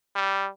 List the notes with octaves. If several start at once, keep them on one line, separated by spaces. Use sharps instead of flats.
G3